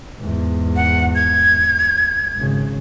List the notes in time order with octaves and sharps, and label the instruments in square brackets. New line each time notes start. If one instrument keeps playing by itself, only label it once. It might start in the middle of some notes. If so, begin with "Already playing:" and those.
[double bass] E2 G#2
[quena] F#5
G#6
[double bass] G#1 C#3